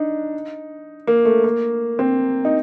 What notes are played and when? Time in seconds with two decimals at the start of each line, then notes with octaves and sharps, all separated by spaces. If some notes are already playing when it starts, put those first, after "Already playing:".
Already playing: D4 D#4
1.07 A#3
1.25 A3
1.44 A#3
1.99 C4
2.45 D#4